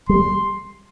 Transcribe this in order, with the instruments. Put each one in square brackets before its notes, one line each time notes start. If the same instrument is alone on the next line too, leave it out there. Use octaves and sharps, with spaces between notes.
[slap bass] G3 [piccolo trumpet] C6